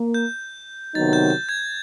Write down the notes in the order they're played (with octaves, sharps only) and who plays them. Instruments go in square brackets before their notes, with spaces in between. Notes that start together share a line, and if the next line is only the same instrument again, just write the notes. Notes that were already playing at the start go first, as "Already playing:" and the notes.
Already playing: [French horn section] A#3
[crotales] G6
[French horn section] C3 D#3 F#3 B3 D#4 [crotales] A6
[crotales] G6
G6
G#6